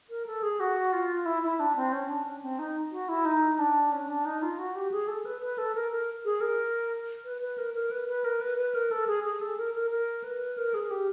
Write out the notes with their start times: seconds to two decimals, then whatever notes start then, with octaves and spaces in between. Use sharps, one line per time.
0.10 A#4
0.26 A4
0.43 G#4
0.60 F#4
0.93 F4
1.26 E4
1.43 E4
1.60 D4
1.76 C4
1.93 C#4
2.09 D4
2.25 C#4
2.42 C4
2.59 D#4
2.92 F#4
3.09 E4
3.25 D#4
3.59 D4
3.92 C#4
4.08 D4
4.25 D#4
4.42 F4
4.59 F#4
4.75 G4
4.91 G#4
5.08 A4
5.25 B4
5.42 B4
5.58 A4
5.75 A#4
5.92 A#4
6.25 G#4
6.41 A#4
7.25 B4
7.42 B4
7.58 A#4
7.74 A#4
7.91 B4
8.08 B4
8.24 A#4
8.41 B4
8.58 B4
8.75 A#4
8.91 A4
9.07 G#4
9.24 G#4
9.41 A4
9.58 A#4
9.74 A#4
9.91 A#4
10.24 B4
10.58 A#4
10.74 G#4
10.91 G4